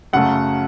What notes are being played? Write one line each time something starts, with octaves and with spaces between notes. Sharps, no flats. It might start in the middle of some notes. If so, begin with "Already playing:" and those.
F#2 C#3 F#3 A3 F#5